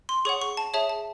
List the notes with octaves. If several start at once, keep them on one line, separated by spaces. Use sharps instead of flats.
C6
G#4 C#5 F#5 C#6
C#6
A5
G#4 C#5 E5 A5
A5